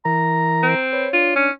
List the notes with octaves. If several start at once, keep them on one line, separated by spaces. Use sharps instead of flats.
E3 A#4 A#5
C4
B4 C#5
D4 F4
C#4